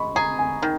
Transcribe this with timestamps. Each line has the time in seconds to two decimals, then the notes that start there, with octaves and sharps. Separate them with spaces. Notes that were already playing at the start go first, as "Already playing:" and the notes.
Already playing: G#3 B5 C#6
0.16 G#4 A#5
0.39 G#5
0.62 D#3